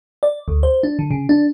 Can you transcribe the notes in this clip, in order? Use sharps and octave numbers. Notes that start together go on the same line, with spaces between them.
D5
D2
C5
D4
D3
C#3
D4